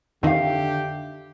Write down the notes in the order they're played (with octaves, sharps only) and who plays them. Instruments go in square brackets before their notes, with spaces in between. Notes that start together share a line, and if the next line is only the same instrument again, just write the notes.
[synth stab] F2 D#3 [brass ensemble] D3 G4 [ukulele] E5 F5